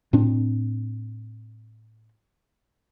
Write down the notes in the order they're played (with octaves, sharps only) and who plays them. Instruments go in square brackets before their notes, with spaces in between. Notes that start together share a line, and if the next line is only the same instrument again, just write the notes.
[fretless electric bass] A2 C4 D4